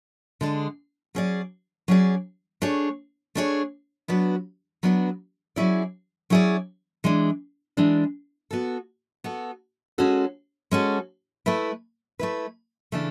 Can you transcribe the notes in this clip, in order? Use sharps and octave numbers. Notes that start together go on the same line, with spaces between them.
D3 G#3 D4 G#4
F#3 C#4 G#4 D5
F#3 C#4 G#4 D5
A3 D4 G#4 C#5
A3 D4 G#4 C#5
F#3 B3 D4 F#4 B4
F#3 B3 D4 F#4 B4
F#3 C#4 E4 G#4 D5
F#3 C#4 E4 G#4 D5
E3 G#3 D4
E3 G#3 D4
B3 F#4 A4
B3 F#4 A4
G#3 C#4 F#4 A4
G#3 C#4 F#4 A4
A3 E4 B4
A3 E4 B4
C#3 E3 A3 D4 A4